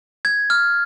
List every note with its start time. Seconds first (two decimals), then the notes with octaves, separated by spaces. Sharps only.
0.25 G#6
0.50 F6